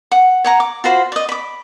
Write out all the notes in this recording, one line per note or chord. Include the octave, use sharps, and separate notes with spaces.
F#5
C#5 F#5 A#5
D6
F4 F#4 C5 B5
D5 D#5
B5 D6